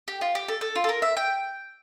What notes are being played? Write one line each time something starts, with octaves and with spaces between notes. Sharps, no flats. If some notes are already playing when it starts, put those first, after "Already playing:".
G4
F4
G4
A4
A4
F4
A4
A#4
E5
G5